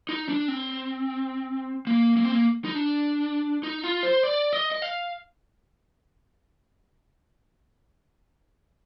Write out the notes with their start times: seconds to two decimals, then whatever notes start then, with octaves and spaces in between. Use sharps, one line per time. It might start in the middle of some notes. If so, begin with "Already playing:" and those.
0.09 D#4
0.29 D4
0.48 C4
1.87 A#3
2.17 A#3
2.25 C4
2.32 A#3
2.65 D#4
2.75 D4
3.63 D#4
3.84 F4
4.03 C5
4.23 D5
4.53 D#5
4.72 D#5
4.82 F5